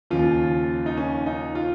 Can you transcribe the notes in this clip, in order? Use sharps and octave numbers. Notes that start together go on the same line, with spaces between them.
D#2 C#3 F3 F4
D#4
C#4
D#4
F4